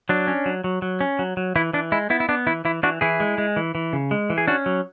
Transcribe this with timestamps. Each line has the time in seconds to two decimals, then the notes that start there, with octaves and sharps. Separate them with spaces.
0.09 F#3 D4
0.27 C#4
0.46 F#3
0.64 F#3
0.82 F#3
1.01 C#4
1.19 F#3
1.37 F#3
1.56 E3 E4
1.73 E3 D4
1.92 G#3 E4
2.10 B3 E4
2.20 E4
2.29 B3 D4
2.47 E3 E4
2.65 E3 E4
2.83 E3 D4 F#4
3.01 E3 E4 G#4
3.20 G#3
3.38 G#3
3.57 E3
3.75 E3
3.93 C#3
4.11 G#3
4.30 E3
4.38 G#4
4.48 C#4 D4 F#4
4.66 F#3